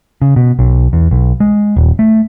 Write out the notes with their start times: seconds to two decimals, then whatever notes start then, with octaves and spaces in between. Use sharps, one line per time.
0.22 C#3
0.36 B2
0.59 B1
0.93 E2
1.11 B1
1.40 G#3
1.77 D#1
1.99 A3